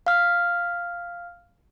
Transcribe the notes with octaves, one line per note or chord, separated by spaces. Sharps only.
F5 F6